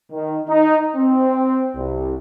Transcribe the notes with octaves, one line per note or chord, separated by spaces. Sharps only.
D#3
D#4
C4
C2